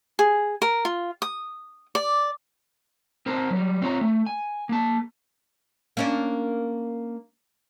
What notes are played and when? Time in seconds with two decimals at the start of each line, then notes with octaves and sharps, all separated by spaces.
0.19 G#4
0.62 A#4
0.85 F4
1.22 D#6
1.95 D5
3.26 C4 A#4 C5 A5 A#5
3.50 F#3 G3
3.82 C4 F4 C#5 A5 A#5
4.01 A3
4.26 G#5
4.69 A#3 A5
5.97 A#3 C#4 D4